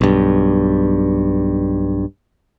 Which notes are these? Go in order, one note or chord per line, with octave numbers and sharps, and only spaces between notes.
B1 G2